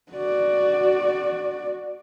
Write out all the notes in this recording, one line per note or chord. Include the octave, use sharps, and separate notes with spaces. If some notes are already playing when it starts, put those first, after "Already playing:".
F#4 D5